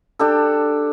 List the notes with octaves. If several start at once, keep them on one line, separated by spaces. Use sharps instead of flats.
D4 G4 A4